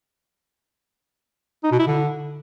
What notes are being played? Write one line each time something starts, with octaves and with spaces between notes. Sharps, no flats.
D#4
B2
E4
D3